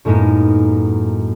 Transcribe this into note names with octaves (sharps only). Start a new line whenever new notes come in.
F#2 A2 G#3 A#3 B3 D#4